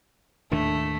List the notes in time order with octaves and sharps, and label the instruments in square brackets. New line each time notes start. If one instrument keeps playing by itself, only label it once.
[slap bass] D#2 A2 D3 [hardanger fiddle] A3 [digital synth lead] D4